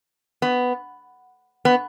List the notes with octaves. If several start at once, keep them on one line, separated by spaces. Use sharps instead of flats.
B3
B3